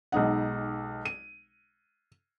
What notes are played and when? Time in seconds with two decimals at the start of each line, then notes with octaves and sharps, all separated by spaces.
0.12 B1 G#3 D#4 F#5
1.05 D#7